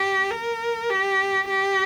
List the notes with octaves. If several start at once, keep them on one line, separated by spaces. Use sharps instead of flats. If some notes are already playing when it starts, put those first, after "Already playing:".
Already playing: G4
A#4
G4
G4